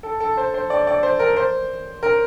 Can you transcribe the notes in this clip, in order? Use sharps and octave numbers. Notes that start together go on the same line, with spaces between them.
A4
A4
C5
C5
D5
D5
C5
A#4
C5
A#4